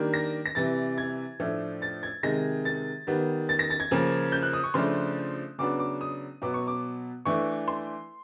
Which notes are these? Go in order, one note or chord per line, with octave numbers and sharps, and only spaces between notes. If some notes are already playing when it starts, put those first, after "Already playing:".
Already playing: D#3 G3 A#3 D4
A#6
A#6
C3 E3 G3 A6
G#6
A2 F3 A3 D4
A6
G#6
C3 D#3 G#3 A#6
A6
D#3 G3 B3
A6
A#6
A6
G#6
C#3 F3 A#3
G6
F#6
D#6
C#6
C#3 F3 A3 D4 C6
C#3 F#3 B3 D4 D6
D6
D#6
B2 F#3 B3 D6
C#6
D6
E3 A3 D4 C#6
C6